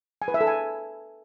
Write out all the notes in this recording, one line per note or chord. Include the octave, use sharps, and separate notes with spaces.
G#5
B4
E5
A4
G#5